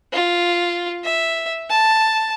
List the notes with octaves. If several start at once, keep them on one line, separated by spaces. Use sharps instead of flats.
F4
E5
A5